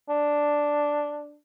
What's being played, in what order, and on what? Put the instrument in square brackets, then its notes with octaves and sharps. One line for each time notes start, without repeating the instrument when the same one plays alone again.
[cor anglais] D4